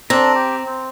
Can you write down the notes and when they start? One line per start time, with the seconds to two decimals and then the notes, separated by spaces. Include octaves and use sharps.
0.10 C4 D4 A4 A#5
0.35 G4
0.66 C4